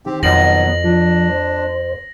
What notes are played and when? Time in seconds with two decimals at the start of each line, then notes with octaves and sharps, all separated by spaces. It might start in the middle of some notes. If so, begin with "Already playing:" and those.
0.06 D#3 C4 G4
0.23 F2 B2 F#3 B3 A#6 F#7
0.84 F3 D4
1.29 C5